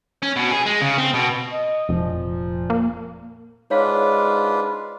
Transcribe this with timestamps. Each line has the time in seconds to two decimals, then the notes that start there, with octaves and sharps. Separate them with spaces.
0.23 C#4
0.36 B2
0.51 G#4
0.66 G#3
0.81 C#3
0.98 C4
1.14 B2
1.52 D#5
1.89 F1 A#2 F3
2.70 A#3
3.71 G#2 D4 F4 B4 C#5 F5